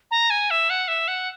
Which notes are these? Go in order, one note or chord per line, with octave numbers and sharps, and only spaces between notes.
A#5
G#5
E5
F#5
E5
F#5